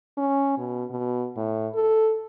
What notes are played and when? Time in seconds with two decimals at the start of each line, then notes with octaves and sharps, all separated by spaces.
0.17 C#4
0.58 B2
0.90 B2
1.36 A2
1.74 A4